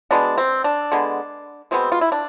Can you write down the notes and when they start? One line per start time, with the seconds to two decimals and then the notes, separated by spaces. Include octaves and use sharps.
0.11 B2 G#3 B3 D4
0.38 C4
0.64 D4
0.92 D3 G#3 B3
1.71 B2 G#3 B3 C4
1.92 F4
2.01 E4
2.12 D4